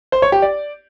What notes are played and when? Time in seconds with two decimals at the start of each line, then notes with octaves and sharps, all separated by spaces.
0.12 C5
0.22 C#5
0.32 G4
0.42 D5